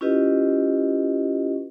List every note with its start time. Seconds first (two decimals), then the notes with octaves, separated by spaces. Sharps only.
0.01 C#4 E4 F4 G4 B4 D#5